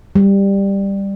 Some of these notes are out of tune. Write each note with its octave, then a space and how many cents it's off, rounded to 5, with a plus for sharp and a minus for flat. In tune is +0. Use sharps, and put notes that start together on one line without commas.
G3 +10